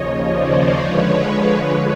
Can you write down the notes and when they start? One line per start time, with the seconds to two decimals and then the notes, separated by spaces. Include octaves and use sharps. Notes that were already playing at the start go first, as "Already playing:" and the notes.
Already playing: D#2 C#3 F3 C#5 D#5
0.31 C5 D5
0.78 D3 F3 G#3 B4 C#5